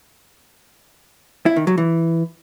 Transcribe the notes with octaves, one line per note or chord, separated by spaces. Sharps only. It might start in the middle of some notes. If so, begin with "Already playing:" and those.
E4
D#3
F#3
E3